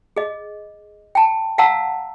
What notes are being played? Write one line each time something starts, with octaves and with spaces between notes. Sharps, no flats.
G#4 D#5
G5 A5
F5 F#5 A5 A#5 E6